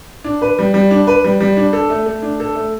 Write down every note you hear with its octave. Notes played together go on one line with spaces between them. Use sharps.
D4
B4
G3
G3
D4
B4
G3
G3
D4
A4
A3
A3
D4
A4
A3